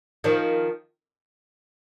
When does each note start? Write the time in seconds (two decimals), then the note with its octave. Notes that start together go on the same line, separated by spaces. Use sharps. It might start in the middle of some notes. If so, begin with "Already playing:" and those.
0.24 D#3 F3